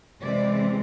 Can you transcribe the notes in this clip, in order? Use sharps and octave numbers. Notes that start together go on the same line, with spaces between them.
C3 E3 G#3 C4 D5